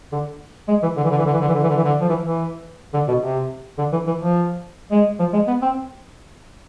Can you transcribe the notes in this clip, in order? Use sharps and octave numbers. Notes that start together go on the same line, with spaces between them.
D3
G#3
E3
D3
E3
D3
E3
D3
E3
D3
E3
D3
E3
D3
E3
D3
F3
E3
E3
D3
B2
C3
D3
E3
E3
F3
G#3
F3
G#3
B3
C4